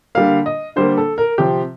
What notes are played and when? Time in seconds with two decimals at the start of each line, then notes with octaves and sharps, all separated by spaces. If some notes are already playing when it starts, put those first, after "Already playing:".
0.15 D3 G3 A#3 F5
0.46 D#5
0.76 D3 G3 A#3 C5
0.98 A4
1.18 A#4
1.38 C3 F3 C4 G4